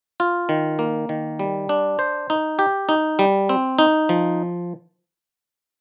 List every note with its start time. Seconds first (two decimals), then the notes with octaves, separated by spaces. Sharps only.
0.20 F4
0.49 D#3
0.79 A#3
1.09 D#3
1.39 G3
1.69 D4
1.99 C5
2.30 D#4
2.59 G4
2.89 D#4
3.19 G3
3.49 C4
3.79 D#4
4.09 F3